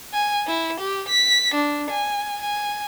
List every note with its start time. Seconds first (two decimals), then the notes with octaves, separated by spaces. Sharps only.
0.13 G#5
0.47 E4
0.80 G4
1.09 B6
1.54 D4
1.90 G#5
2.42 G#5